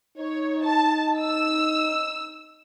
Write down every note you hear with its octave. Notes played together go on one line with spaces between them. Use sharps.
D#4 C#5
A5
E6